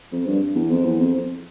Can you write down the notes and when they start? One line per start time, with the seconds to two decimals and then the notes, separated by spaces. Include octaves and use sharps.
0.12 F2
0.26 G2
0.55 E2
0.70 F2
0.84 E2
0.99 F2